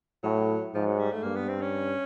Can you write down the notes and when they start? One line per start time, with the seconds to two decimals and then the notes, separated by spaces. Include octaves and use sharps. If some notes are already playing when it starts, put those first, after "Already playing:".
0.23 A2 F#3
0.74 G#2 F3
0.86 F#3
0.99 G3
1.12 A3
1.23 G2 A#3
1.36 B3
1.48 C4
1.61 C#4